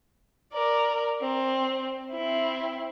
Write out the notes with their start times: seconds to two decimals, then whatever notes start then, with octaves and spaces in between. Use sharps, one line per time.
0.53 A#4 D5
1.21 C4
2.12 C4 E4